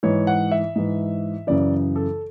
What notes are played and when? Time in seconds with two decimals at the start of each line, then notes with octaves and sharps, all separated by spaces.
0.03 G#2 E3 C#5
0.27 F#5
0.51 E5
0.76 G#2 E3
1.47 F#2 C#3 E3 D5
1.96 A4